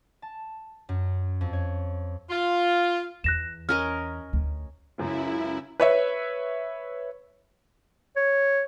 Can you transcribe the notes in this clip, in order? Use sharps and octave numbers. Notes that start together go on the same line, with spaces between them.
A5
F#2
F2
C#5
F4
E2 F#6 A#6 E7
C#4 A#4 D#5 F6
D2
C#2 F#2 C#3 E4
B4 C#5 E5
C#5